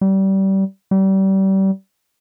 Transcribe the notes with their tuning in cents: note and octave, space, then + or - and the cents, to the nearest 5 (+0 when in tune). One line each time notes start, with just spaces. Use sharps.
G3 -25
G3 -30